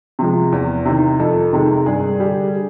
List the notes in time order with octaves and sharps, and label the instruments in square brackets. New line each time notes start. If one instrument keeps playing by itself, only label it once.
[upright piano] C3 F3 G#3
E2
C3 D#3
F2 A4
C3 D#3 G#3
G2 G#4
D3 G3